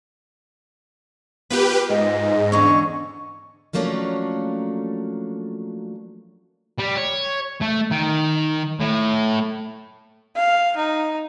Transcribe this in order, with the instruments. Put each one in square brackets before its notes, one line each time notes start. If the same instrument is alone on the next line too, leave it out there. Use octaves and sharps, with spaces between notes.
[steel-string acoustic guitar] B3 F4 A#4 [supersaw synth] G4 B4
[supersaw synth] G#2 [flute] D#5
[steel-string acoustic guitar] E2 D3 C#4 [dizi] C#6
[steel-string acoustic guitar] F3 F#3 A3 A#3 C#4 D4
[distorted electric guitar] G3
C#5
A3
D#3
A2
[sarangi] F5
D#4